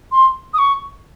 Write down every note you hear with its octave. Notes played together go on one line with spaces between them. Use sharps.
C6
D#6
C#6